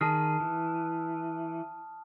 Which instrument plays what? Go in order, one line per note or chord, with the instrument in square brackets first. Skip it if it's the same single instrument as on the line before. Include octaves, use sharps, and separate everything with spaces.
[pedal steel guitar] D#3 G#4 [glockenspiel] A5 D#6 F6
[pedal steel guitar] E3